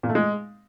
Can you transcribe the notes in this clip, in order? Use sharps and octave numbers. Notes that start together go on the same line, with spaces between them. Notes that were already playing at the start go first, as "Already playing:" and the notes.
A#2
A3
G#3